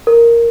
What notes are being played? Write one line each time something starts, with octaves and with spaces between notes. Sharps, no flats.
A#4